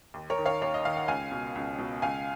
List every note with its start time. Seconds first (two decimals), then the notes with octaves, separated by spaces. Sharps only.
0.14 D#2
0.30 A#4 C#5
0.38 D#3
0.46 C#5 F5
0.62 D#2 C#5
0.74 D#5
0.85 D#3 F5
0.97 F#5
1.08 C#2 F5 G#5
1.32 B2
1.55 C#2
1.78 B2
2.02 C#2 F5 G#5